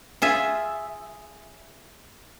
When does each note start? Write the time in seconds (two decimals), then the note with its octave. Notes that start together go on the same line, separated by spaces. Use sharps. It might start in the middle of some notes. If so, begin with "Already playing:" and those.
0.22 F4 G#4 E5